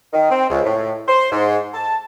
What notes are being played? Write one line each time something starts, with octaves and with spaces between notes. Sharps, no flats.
D#3
C4
C#2
A2
C5
G#2
A5